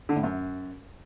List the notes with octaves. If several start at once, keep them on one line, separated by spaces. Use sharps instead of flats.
D3
A2
F#2